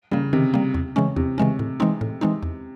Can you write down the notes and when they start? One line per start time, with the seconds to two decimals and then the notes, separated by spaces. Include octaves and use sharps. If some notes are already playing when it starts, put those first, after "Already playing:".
0.11 C#3 G3 A#3
0.33 C3 D#3
0.54 G3 A#3
0.74 E2
0.96 C#3 E3 G#3 C#4
1.16 E2 C3
1.38 C#3 E3 G#3 C#4
1.59 A2
1.80 E3 G#3 C4 D#4
2.01 A2
2.21 E3 G#3 C4 D#4
2.43 E2